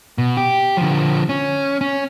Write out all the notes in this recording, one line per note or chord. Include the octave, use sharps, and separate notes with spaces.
B2
G4
D3 F3
C#4
C#4